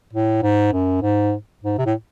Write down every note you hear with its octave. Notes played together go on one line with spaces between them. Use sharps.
A2
G#2
F#2
G#2
G#2
C3
A2